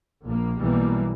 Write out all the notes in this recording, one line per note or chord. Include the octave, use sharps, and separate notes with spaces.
A#1 A#3
B1 B2 E3 G3 A#3